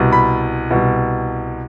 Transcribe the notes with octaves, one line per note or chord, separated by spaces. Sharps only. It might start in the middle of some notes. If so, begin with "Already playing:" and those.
Already playing: C2 B2
B5
C2 B2